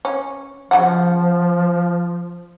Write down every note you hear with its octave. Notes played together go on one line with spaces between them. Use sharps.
C#4
C#3 F3 F#4 F#5